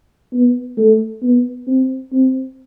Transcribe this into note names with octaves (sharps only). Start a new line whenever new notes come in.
B3
A3
B3
C4
C4